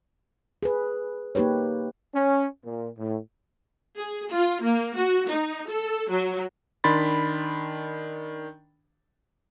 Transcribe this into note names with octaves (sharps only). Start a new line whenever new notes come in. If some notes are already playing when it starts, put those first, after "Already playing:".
G#4 B4
A#3 D#4 G4 B4 C#5
C#4
A#2
A2
G#4
F4
A#3
F#4
D#4
A4
F#3
D#3 D4 B5 C6 A6